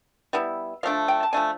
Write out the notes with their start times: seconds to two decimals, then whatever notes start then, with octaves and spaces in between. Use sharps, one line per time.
0.33 G3 B3 E4
0.83 F3 A3 D4 F5
1.08 G5
1.23 A5
1.33 F3 A3 D4 G#5